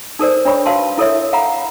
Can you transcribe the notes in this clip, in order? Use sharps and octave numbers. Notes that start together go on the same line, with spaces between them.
D#4 A4 A#4 C5 D5
D4 C#5 B5 C#6
F#4 B4 F5 A5 C6
E4 A4 A#4 C#5 E5
F5 F#5 A#5 B5